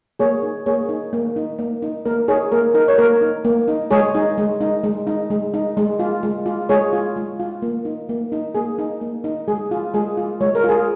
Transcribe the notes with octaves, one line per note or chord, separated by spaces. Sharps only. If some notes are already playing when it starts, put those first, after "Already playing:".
A#3 G#4 C#5
D#4
A#3 G#4 C#5
D#4
A#3
D#4
A#3
D#4
A#3 A#4
D#4 G#4 C#5
A#3 A#4
D#4 A#4
C#5
A#3 A#4
D#4
A#3
D#4
G#3 G#4 C#5
D#4
G#3
D#4
G#3
D#4
G#3
D#4
G#3
F4
G#3
F4
G#3 G#4 C#5
F4
G#3
F4
A#3
D#4
A#3
D#4
A#3 G#4
D#4
A#3
D#4
G#3 G#4
F4
G#3 G#4
F4
G#3 C#5
A#4
F4 G#4